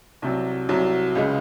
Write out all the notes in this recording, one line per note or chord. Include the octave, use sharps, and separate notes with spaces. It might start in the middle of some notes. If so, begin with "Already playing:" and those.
C2 C3 F#3
C2 C3 F#3
C#2 C#3 G#3